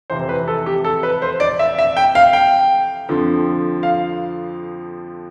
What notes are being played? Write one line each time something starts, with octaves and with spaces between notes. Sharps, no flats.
F2 C3 E3 C5
B4
A4
G4
A4
B4
C5
D5
E5
E5
G5
F5
G5
F2 D3 F3
F5